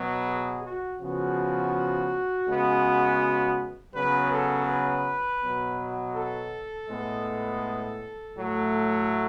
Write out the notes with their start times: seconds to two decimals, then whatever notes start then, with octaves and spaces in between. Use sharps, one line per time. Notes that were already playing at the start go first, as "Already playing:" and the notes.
Already playing: B2 F#3 B3
0.26 G#4
0.63 F#4
1.00 C#3 F3 B3 F#4
2.47 C#3 G#3 B3
3.94 C#3 F#3 B3 B4
4.31 A4
4.68 B4
5.41 B2 F#3 B3
6.15 A4
6.89 A2 G#3 B3
8.36 A2 F#3 A3